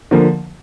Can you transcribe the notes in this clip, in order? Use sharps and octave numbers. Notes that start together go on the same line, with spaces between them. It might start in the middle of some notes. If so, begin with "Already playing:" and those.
D3 F3 A#3